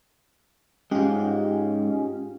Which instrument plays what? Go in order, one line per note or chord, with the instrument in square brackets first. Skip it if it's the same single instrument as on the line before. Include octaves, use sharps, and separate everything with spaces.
[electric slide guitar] G#2 G#3 [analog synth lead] C#4 [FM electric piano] F4 G4